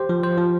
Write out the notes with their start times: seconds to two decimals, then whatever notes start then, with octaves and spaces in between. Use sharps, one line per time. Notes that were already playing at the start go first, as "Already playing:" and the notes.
Already playing: G4 C5
0.09 F3
0.23 C5
0.38 F3